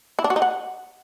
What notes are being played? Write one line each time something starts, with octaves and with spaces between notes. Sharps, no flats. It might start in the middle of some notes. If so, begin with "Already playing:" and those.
E4
D4
F#4
D#4
F#5